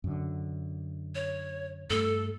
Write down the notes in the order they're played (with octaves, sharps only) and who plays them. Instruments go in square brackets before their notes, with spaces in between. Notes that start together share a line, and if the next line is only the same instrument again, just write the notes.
[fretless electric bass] F#2 D3
[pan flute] C#5
[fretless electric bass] G2 A3 [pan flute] A4